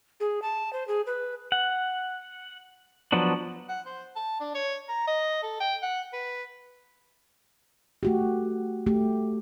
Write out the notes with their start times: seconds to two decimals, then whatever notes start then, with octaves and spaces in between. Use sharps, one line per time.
0.20 G#4
0.42 A5
0.73 C5
0.88 G#4
1.07 B4
1.52 F#5
3.12 F3 F#3 B3 D4
3.69 F#5
3.86 C5
4.16 A5
4.40 D4
4.55 C#5
4.88 A#5
5.07 D#5
5.43 A4
5.60 G5
5.82 F#5
6.13 B4
8.03 A3 F#4 G4
8.87 A3 G4